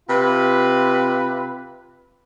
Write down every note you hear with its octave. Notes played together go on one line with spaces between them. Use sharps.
C3 F4 B4